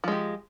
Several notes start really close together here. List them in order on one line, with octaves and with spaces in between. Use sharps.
F3 G#3 G4